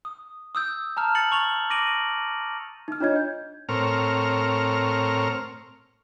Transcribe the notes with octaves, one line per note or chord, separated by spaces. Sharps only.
D#6
D#6 E6 G6
A5 A#5 F6
A6 C#7 F#7
C#6 F7 F#7
D6 A#6 D7 D#7 F#7
D#4 F6
D4 F4 C#5 D#5 G#6
G6
A2 C4 A#4 C#5 F6